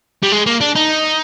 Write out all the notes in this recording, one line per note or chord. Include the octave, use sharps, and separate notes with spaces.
G3
G#3
A#3
D4
D#4